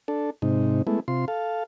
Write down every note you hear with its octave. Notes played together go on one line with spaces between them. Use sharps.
D4 A4
G#2 C3 D#4
G#3 A3 B3 E4
C3 F4 C6
A4 F5